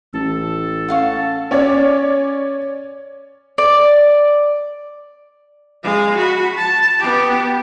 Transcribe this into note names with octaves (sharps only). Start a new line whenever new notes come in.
A1 A4
C#4 F5 F#5
C#4 C#5 D5
D5
G#3 F5
F#4 B5
A5
B3 G4